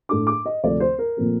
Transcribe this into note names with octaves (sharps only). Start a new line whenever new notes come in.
A2 A3 D4 D6
D6
D#5
D2 C3 F3 A3 D5
C5
A#4
A#2 F3 A3 C4